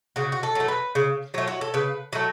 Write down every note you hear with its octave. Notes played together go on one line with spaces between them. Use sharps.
C#3 F#4
F#4
A4
F#3 A3
B4
C#3
F#3 A3 C#5
F#4
A4
C#3 B4
F#3 A3